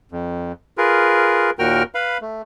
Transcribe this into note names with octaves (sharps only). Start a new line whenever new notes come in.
F2
F4 G#4 A#4 B4
D#2 A#2 F#4 A#4 G5 F6
B4 F5 B5
A3